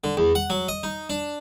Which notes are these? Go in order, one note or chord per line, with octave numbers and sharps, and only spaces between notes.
D3
E2
F#5
F#3
D#5
D#4
D4